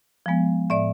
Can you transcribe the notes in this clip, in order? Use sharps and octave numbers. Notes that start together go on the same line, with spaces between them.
F3 G#3 B3
A2 D5 E5